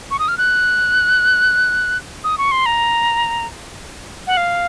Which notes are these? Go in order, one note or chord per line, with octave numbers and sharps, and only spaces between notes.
C#6
D#6
F6
F#6
D#6
C#6
C6
A#5
F#5
F5